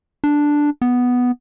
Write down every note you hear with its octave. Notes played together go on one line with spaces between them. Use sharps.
D4
B3